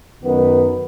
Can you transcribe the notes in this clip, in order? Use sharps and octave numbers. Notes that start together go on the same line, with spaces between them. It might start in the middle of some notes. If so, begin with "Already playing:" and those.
F#2 D#3 B3